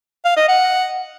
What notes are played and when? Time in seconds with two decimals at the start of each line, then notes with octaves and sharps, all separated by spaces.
0.25 F5
0.37 D#5
0.48 F#5